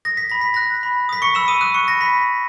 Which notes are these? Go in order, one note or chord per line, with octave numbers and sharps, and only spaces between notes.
D#6 A#6
B6
B5 A#6
B6
F#6 A#6
B5
D#6 B6
C#6 C#7
B5 E6 E7
D#6 D#7
D#6 F#6 D#7
C#6 C#7
B5 A#6
B5 B6
C#6